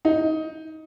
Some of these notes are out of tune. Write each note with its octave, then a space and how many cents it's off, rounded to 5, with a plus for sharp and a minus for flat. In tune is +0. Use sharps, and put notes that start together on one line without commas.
D#4 +20